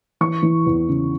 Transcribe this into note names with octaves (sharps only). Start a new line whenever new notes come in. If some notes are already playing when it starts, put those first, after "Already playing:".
E3 C#6
E3
E2
C#3